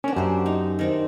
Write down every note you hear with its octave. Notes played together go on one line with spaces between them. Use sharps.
A#3 C#4 D4
F#2 G4 C5
D#4
D#3 C4 D4